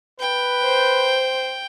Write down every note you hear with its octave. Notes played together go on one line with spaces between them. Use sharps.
B4 G5
C5